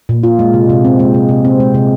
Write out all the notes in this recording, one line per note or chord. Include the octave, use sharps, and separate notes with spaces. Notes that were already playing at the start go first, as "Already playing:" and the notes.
A#2
F4
G#3
C3
C3
C4
G#3
C3
C3
C4
G#3
C3